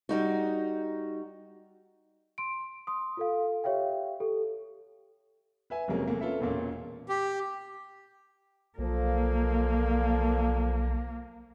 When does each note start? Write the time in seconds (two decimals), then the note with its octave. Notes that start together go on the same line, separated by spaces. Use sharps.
0.09 G3 D#4 F#4
2.38 C6 D7
2.87 C6 D#6
3.17 F4 A4 F5
3.64 G4 C#5 E5 F5 G5
4.20 G4 A4
5.70 B4 E5 G#5
5.88 F1 F3 F#3 G#3 A#3 C#4
6.08 E2 A3 A#3
6.21 C#4 F4 A4 B4 E5
6.41 E1 A#2 A#3 C#4
7.09 G4
8.78 B1 A#2 F3 A#3 A4